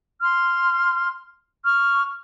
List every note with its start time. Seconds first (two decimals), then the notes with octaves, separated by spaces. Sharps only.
0.20 C6 F6
1.64 C#6 F6